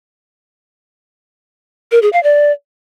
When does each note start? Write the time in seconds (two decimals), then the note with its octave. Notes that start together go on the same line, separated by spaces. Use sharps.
1.92 A#4
2.02 G#4
2.13 F5
2.23 D5